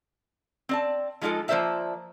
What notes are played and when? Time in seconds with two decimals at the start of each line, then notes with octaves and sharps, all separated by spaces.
0.69 C4 D5 A5
1.21 F3 G#3 D#4 F4 A4
1.48 F3 A#3 C5 D5 E5 A5